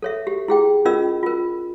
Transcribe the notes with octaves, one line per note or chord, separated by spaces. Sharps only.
A4 C#5 E5
G4
E4 G#4 G5
C#4 F4 A#4 D#5 E6
F4 A#4